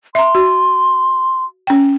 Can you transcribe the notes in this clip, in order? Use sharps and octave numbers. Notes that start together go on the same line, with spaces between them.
E5 A#5 C6
F#4
C#4 G5